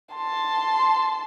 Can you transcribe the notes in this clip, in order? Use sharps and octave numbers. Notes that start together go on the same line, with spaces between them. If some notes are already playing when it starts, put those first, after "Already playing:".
A5 C6